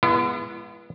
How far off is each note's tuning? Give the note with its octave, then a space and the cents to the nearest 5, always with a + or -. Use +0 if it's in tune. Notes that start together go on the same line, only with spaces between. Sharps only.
G#3 -10 B3 -20 E4 +40